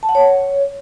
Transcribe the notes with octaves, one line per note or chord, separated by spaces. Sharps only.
A5
F#5
C#5